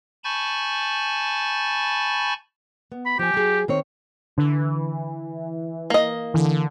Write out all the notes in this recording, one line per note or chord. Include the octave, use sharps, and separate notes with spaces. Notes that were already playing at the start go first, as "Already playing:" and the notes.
G#5 A5 B5 C#6 G6 A6
B3
B5
F3 G4 G#5
F#3 G#4
D#3 C4 C#5
D3 E3
A#3 D#5
D3 E3